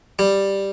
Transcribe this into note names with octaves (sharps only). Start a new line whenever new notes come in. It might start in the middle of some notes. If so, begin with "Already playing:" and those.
G3